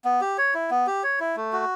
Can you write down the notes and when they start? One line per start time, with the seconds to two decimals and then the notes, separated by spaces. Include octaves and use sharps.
0.05 B3
0.21 G4
0.38 C#5
0.54 E4
0.71 B3
0.87 G4
1.03 C#5
1.20 E4
1.36 A3
1.53 F#4